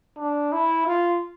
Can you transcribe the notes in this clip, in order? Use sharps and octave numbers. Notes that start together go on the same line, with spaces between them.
D4
E4
F4